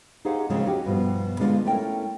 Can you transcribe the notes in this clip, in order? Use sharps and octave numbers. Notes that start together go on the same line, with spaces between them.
D#4 G4 G#4 C5 F5 F#5
D#2 C#3 F3 F#3 G#3 C4
C#4 D#4 F#4 G4
G2 B2 F3
D3 G#3 B3 D4 F4 D#5
A3 C#4 E4 A#4 G5